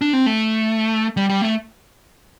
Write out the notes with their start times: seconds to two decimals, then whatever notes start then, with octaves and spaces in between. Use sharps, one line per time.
0.01 D4
0.13 C4
0.26 A3
1.17 G3
1.29 G3
1.42 A3